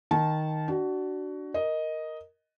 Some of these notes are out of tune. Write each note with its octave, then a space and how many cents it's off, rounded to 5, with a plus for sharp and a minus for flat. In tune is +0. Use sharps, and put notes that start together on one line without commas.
D#3 +0 A5 -20
D4 +0 F#4 +20
A#4 +0 D#5 +5